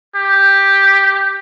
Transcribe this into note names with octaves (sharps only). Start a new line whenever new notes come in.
G4